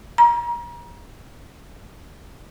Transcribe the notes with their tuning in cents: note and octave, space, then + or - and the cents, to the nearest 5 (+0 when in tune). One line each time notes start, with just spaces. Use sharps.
A#5 +30